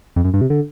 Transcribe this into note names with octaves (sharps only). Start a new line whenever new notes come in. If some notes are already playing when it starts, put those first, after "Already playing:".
F2
F#2
G2
C3
D3